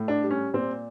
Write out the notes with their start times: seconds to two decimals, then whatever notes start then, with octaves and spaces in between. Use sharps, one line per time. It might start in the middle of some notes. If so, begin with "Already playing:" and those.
Already playing: A2
0.08 D4
0.23 G3
0.31 C#4
0.54 A#2 C4